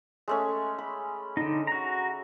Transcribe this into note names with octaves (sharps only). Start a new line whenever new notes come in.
G#3 A3 C#4
B5
D3 D#4
F#4 A#5